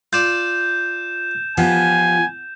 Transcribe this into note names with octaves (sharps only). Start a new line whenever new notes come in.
F4 D5 G6 E7
F3 B3 F4 G4 G#5